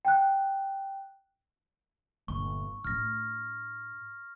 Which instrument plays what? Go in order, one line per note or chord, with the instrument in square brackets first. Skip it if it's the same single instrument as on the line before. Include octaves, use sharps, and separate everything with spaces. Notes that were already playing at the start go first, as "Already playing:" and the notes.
[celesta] G5 F#6
[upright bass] G1 A#2 [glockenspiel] C#6
[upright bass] A2 D4 [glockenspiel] F6 A#6